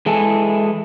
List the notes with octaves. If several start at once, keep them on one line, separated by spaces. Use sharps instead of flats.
E3 G#3 E4 G#4 A4